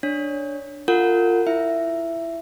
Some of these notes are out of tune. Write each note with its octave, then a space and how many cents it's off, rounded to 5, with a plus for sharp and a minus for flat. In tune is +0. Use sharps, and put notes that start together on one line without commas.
D4 +0 C#5 +0
F4 +0 A#4 -40 F#5 -10
E4 +15 E5 +15